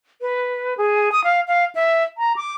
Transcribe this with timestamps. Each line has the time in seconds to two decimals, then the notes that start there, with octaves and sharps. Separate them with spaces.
0.21 B4
0.77 G#4
1.12 D#6
1.24 F5
1.48 F5
1.75 E5
2.18 A#5
2.36 D6